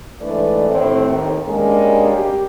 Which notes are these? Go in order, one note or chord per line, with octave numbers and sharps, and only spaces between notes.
G#2 E3 A3 D4 B4 D5
D#2 A2 C4
D#2
G3 G#3 A#3 C#4 D4 G#4
G4